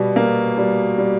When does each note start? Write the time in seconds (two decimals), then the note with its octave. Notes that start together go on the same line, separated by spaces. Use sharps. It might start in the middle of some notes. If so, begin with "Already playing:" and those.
Already playing: B2 G3 D5
0.16 A#3
0.58 G3
0.98 G3